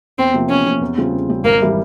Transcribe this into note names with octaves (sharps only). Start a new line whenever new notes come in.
E2 C4
C3 F3 A#3
E2 C#4
C3 F3 A#3
E2
C#3 G3 C4 F4
E2
C#3 G3 C4 F4
G#1 A#3
E3 G3